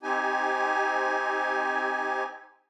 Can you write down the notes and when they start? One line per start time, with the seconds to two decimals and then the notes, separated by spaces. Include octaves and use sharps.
0.03 C4 D#4 G4 G#5